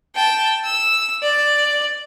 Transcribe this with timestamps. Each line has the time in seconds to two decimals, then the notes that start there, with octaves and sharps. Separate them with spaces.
0.15 G5 A5
0.64 E6
1.23 D5